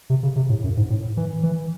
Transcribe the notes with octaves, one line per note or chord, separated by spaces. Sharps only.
C3
C#3
C3
A2
F#2
G#2
A2
E3
E3